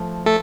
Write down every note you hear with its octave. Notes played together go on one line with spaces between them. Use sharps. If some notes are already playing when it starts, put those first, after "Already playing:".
Already playing: F3 A3
A3 A4